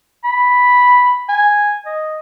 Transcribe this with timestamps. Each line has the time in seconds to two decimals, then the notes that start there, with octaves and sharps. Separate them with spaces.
0.24 B5
1.29 G#5
1.86 D#5